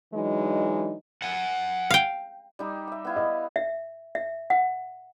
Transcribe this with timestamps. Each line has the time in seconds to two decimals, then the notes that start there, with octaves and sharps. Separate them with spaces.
0.14 E3 F#3 G#3 D4 D#4
1.22 F#5 G#5
1.91 F5 G5
2.59 G3 D#4 G4
2.88 E5 G5
3.05 B3 E4 F5
3.16 D#5
3.56 E5
4.15 E5
4.50 F#5